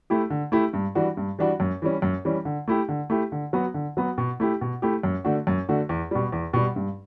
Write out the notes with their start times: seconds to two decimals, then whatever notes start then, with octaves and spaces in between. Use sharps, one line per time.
0.10 A3 E4 G4
0.30 D3
0.52 A3 E4 G4
0.73 G2
0.95 E3 G3 D4 F#4
1.17 G2
1.39 E3 G3 D4 F#4
1.60 F#2
1.82 E3 G3 C#4
2.02 F#2
2.25 E3 G3 C#4
2.45 D3
2.68 A3 E4 G4
2.89 D3
3.10 A3 E4 G4
3.32 D3
3.53 F#3 B3 F#4
3.74 D3
3.97 F#3 B3 F#4
4.18 B2
4.40 A3 E4 G4
4.61 B2
4.82 A3 E4 G4
5.03 F#2
5.25 D3 A3 D4 F#4
5.47 F#2
5.69 D3 A3 D4 F#4
5.89 E2
6.11 B2 G3
6.32 E2
6.53 B2 G3
6.76 G2